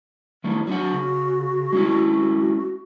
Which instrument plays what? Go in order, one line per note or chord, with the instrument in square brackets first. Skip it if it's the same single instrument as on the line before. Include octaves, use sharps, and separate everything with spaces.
[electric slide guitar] D#3 E3 A3
[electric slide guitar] F#3 D4 F#5 [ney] F#4
[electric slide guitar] C#3
G#3 C#4 E4